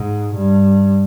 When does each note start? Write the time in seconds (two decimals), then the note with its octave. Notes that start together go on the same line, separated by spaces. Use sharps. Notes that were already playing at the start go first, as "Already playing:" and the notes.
Already playing: G#2
0.36 G2